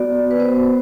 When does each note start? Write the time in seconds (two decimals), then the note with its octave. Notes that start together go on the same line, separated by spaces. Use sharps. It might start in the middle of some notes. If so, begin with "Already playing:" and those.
Already playing: B3 F#4 D5
0.31 B4
0.39 B3 F#4 C5